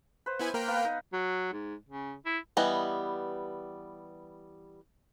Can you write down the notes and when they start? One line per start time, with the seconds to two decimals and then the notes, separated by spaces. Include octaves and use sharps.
0.26 B4 C5
0.39 B3 E4 G#5
0.54 A#3 A#4 G5
0.68 B3 B4 F5
0.85 D#4
1.13 F#3
1.53 G#2
1.89 C#3
2.26 E4
2.57 E3 G3 B3 D#5